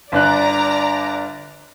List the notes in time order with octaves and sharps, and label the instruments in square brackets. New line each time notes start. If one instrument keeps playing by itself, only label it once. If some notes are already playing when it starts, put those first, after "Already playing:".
[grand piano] G1 D4 F#6 [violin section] D5 A#5